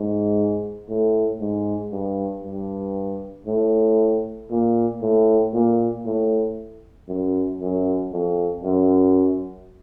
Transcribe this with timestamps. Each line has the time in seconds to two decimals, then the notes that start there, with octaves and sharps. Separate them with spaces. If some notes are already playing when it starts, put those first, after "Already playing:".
Already playing: G#2
0.89 A2
1.40 G#2
1.92 G2
2.44 G2
3.46 A2
4.50 A#2
5.02 A2
5.53 A#2
6.05 A2
7.08 F#2
7.60 F#2
8.12 F2
8.63 F#2